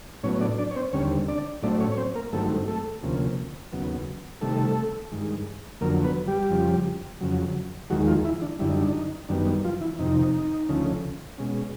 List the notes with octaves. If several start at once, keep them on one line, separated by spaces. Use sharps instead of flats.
A2 F#3 B3 C#4 C#5
D4 D5
D4 D5
C#5
C4 C5
D#2 D3 G3 C4 C#4 C#5
D4 D5
A2 F#3 A3 C4 D4 D5
C#4 C#5
C#5
C4 C5
A#3 A#4
G2 D#3 F#3 A3 C4 A4
A3 A4
D2 C3 F3 A#3 C#4
D#2 C#3 F#3 B3
C3 D#3 G3 A3 A4
G2 D#3 G#3
F2 D3 F#3 A#3 A#4
B3 B4
G3 G4
F2 C#3 F3
F2 C#3 F#3
D#2 D#3 F#3 G#3 F#4
F3 F4
E3 E4
D4
F#2 D3 G3 E4
D#4
D4
D#4
F#2 D#3 G3 B3 D4
F3 F4
E3 E4
F2 C3 D#3 D#4
D2 C#3 F3 A3 C#4
B2 G#3 C#4